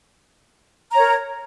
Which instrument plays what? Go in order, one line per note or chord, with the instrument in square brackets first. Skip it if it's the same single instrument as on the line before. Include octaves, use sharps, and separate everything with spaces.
[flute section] A#5
C#5
A#4